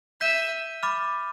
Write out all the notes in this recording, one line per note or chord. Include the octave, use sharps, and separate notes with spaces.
E5 G6 B6 D#7 G7
B5 D6 F6 A6